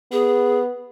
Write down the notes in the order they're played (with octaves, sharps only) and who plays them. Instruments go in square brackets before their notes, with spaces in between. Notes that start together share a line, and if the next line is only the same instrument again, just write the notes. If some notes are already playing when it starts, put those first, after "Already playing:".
[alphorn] B3 [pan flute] G#4